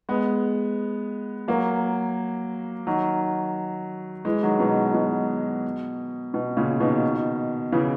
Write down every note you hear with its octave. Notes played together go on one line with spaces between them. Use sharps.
G#3 B3
F#3 A#3
D#3 F#3
E3 G#3
D#3 F#3
B2
B2
B2
A#2 C#3
B2 D#3
C#3 E3